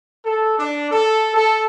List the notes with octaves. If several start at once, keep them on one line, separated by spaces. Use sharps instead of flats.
A4
D4
A4
A4